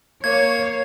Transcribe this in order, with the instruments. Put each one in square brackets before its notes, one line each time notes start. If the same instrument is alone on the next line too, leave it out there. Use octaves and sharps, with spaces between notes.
[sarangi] A#3 [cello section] C#5 [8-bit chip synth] G#6